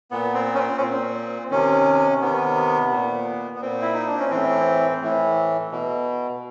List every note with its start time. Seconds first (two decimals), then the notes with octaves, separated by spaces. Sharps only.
0.11 A#2 B3
0.34 C4
0.54 C#4
0.58 C4
0.77 C#4
0.81 A#2 C4
1.51 C3 D#3 C#4
2.21 C3 D#3 B3
2.91 A#2
3.55 B3
3.61 A#2 C4
3.81 E4
3.94 D#4
4.07 D4
4.19 C#4
4.31 A2 E3 C4
5.01 A2 E3
5.72 B2